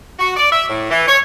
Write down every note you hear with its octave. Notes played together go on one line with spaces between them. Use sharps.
F#4
D5
E5
A2
E3
C#5